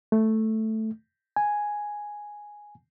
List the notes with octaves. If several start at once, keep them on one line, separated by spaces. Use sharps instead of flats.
A3
G#5